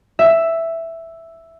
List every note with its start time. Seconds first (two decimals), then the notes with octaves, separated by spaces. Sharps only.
0.19 E5